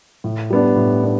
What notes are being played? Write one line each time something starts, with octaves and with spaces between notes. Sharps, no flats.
A2
G3 B3 D4
A2
B3 D4